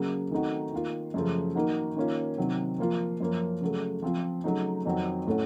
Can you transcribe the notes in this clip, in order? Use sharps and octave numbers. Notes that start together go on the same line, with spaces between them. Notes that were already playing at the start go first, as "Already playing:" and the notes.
Already playing: C#3 F#3 A#3
D#3 A3 C4 D#4 F#4
D#3 A#3 F4
F#2 C#3 F3 A3
D#3 A#3 D#4 F#4
D#3 A#3 C#4 F4
C3 D#3 F#3 C4
F3 A#3 F4
F#2 F3 A#3 C#4
C#3 F#3 A3
F3 C4 F4
C#3 F#3 A3 D#4
F2 D#3 F#3 C4 F#4
A2 A3 C#4 F#4